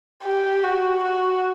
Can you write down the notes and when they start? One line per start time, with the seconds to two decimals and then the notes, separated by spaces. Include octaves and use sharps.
0.23 G4
0.63 F#4
1.03 F#4